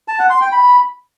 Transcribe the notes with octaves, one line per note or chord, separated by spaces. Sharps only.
A5
F#5
C6
G5
B5